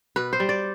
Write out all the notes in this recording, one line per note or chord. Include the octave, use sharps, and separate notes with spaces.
B2 B4
C5
G3
D5